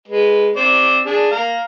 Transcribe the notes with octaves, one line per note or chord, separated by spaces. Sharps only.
G#3 B4
C4 C5 D5
D4 G#4
F5 A#5